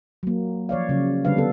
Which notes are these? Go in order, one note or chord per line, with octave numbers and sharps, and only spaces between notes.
F#3 A#3
F3 C#5 D5 F5
C#3 F#3
D3 G3 D4 B4 F5
B3 A4